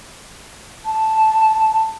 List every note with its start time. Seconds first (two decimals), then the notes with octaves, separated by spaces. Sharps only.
0.85 A5